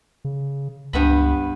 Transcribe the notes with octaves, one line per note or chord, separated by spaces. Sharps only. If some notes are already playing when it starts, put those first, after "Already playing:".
C#3
C#2 G2 B3 B5